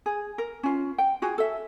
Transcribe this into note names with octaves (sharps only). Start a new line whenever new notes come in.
G#4
A#4
C#4 F4
G5
F4 F#4 G#4
A4 E5